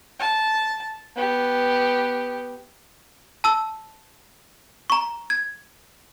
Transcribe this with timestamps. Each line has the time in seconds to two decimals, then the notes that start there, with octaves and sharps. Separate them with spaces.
0.19 A5
1.16 B3 G4
3.44 A5 E6
4.90 A#5 C#6
5.30 G#6